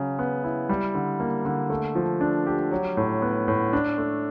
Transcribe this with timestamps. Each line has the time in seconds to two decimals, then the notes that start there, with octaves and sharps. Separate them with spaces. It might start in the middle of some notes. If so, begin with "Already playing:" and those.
Already playing: C#3 F#3
0.19 B3
0.44 E4
0.69 G3
0.94 D3
1.20 A#3
1.45 D3
1.70 A3
1.95 F3
2.21 D4
2.47 G4
2.71 F#3
2.97 A2
3.22 B3
3.48 A2
3.73 D4
3.98 A3